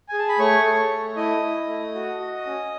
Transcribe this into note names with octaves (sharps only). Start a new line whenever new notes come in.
G#4 G#5
A5
B5
A3 C#5 C#6
A4
A3
E4 D#5 D#6
E4
A3
F#4
F#4
C#4